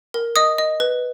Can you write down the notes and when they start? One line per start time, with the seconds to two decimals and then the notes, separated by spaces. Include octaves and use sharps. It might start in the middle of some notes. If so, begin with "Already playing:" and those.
0.14 A#4
0.36 D#5 D#6
0.58 D#5
0.80 B4